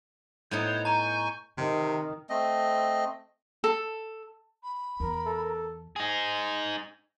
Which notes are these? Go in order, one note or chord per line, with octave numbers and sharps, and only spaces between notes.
A2 B3 D#4 C5 C#5
G#5 A#5 C#6 G6
C3 D#3
A3 C4 D#5
A4
B5
E2 A#4
A4
D#4 G#4